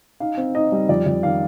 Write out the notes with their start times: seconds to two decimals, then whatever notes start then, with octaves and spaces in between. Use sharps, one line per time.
0.20 D#4 F5
0.37 C4
0.55 D#4 D#5
0.72 G3
0.89 F2 D5
1.06 F2
1.23 D#3 F5